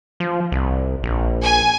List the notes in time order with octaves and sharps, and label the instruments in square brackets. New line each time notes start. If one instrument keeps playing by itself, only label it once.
[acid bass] F3
C2
A#1
[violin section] G#5